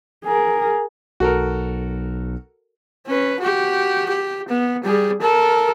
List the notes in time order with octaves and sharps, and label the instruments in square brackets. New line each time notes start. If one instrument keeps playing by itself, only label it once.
[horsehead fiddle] G#4 A#4
[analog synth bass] B1 [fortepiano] F#4 A4 A#4
[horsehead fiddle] C#4 B4
F#4 G4
G4
B3
G3 G#4
A4 A#4